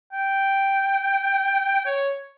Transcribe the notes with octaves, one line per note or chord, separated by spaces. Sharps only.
G5
C#5